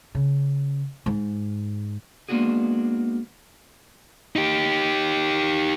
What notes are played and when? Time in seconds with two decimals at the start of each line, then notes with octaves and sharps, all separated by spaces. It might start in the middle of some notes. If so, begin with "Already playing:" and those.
0.15 C#3
1.06 G#2
2.29 G#3 A#3 B3 D4 F#4 G#4
4.36 D#4 G4